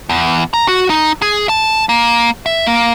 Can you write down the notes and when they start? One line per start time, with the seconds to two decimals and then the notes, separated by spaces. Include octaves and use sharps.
0.09 E2
0.54 A#5
0.68 F#4
0.90 D#4
1.22 G#4
1.49 A5
1.89 A#3
2.46 E5
2.67 A#3